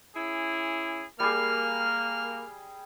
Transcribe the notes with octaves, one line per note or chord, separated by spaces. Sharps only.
C#4 E4 G#4
G3 A#3 G#4 F6